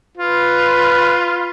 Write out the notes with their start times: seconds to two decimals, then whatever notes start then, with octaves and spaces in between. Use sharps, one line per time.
0.18 F4 B4